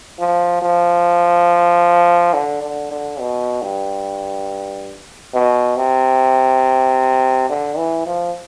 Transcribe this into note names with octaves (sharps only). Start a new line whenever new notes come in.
F3
F3
D3
D3
D3
B2
G2
B2
C3
D3
E3
F3